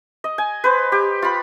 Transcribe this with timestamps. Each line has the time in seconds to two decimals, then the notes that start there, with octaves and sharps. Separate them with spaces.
0.24 D#5
0.38 G#5
0.64 B4 C5
0.92 G4
1.22 F4 B5